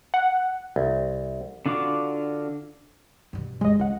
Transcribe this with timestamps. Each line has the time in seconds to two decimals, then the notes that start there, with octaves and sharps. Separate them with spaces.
0.14 F#5
0.76 C2
1.66 D3 D4 F4 F#4 D6
3.33 G2 B2
3.61 G1 G#3 D#5
3.79 C#2 C#4 F#5